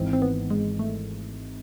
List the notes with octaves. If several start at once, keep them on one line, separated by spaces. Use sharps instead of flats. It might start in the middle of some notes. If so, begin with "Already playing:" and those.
Already playing: G#1 G#2 E3 C4
C4
B3
G#3
A3